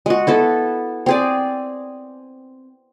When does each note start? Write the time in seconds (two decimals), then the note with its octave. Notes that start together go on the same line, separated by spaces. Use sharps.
0.06 G#3 F#4
0.27 B3 E4 A4
1.06 C4 G#4 D5